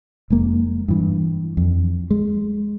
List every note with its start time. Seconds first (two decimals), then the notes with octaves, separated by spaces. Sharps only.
0.30 F1 G#3 A#3
0.88 G2 E3
1.57 F2
2.11 G#3